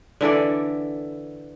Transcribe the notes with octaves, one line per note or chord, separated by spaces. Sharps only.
D3 E3 A4 D5